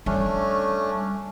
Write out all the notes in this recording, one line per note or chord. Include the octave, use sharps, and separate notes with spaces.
G3 A3 C#4 D4